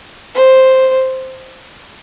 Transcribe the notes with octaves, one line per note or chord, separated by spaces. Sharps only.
C5